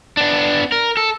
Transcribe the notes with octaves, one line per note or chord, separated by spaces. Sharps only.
B3 D4
A#4
A4